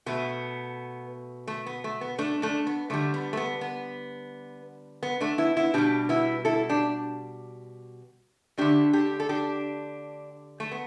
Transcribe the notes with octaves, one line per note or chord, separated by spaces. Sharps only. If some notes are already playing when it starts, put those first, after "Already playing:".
B2 A3 B3
A3
B3
A3
B3
A3 D4
A3 D4
B3
D3 G3 A3
B3
A3
B3
B3
B3
A3 D4
B3 E4
B3 E4
B2 G3 D4 G4
B3 E4
E4 A4
D4 G4
D3 A3 D4 G4
D4 G4
A4
D4 G4
A3
B3